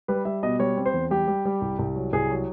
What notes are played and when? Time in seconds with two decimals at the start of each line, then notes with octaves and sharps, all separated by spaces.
0.08 G3 B4
0.25 G3 E5
0.43 B2 D#5
0.59 G3 C#5
0.77 C4
0.86 C5
0.94 E2
1.11 G3 G4
1.28 G3
1.45 G3
1.62 C2
1.79 C2
1.96 F#3
2.13 C2 G#4
2.30 F#3